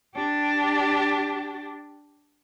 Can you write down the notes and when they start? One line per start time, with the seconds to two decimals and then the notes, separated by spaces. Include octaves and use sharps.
0.15 D4 G4